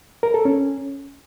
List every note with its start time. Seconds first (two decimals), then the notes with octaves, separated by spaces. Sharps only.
0.23 A#4
0.34 A4
0.45 C#4